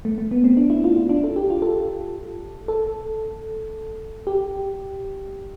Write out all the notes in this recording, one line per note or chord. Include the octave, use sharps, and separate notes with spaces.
A3
A3
B3
C4
D4
E4
F4
F4
D4
A4
G4
F4
A4
A4
G4